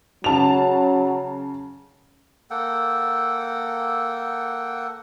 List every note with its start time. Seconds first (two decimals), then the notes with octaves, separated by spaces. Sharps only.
0.24 C#3 F#3 A5 F7
2.50 A#3 A4 F#5 G5